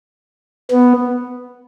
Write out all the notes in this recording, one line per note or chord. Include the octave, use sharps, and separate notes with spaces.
B3